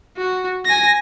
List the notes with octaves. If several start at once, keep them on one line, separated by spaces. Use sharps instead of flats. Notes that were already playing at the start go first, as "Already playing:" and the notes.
F#4
G#5 A#6